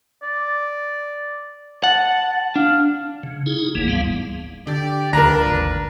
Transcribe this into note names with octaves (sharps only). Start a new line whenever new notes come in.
D5
F#5 A5
D4 F5
C#3
D#4 E4 G#4
F#1 D2 E3 A#3
D2 G#2 G3 B3 F5
D3 G4 D5
D#1 D2 F3 D4 A#4 B4 A#5
G#1 D#2